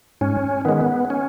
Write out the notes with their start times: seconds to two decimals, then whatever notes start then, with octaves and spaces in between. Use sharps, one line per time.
0.21 G#2 C#4
0.65 D#3 G#3 B3
1.10 C#4